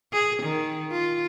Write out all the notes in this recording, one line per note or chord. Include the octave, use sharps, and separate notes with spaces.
G#4
D#3
F4